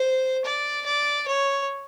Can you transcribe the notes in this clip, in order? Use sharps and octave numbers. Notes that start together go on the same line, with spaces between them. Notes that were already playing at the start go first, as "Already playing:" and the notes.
Already playing: C5
D5
D5
C#5